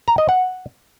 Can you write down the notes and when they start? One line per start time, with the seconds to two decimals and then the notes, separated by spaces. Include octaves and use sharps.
0.08 A#5
0.18 D#5
0.29 F#5